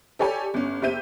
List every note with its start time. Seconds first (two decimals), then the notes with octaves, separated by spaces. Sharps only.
0.19 G4 A4 C#5 D5 G#5
0.54 G1 C#4
0.82 F#1 G4 C5 E5 G6 D#7